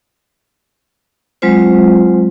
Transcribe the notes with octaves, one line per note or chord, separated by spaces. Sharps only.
F#3 G#3 C4 F4 C5